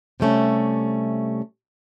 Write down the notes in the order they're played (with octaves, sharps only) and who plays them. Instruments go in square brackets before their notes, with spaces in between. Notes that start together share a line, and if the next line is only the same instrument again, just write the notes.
[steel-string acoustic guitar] C3 G3 A3 C#4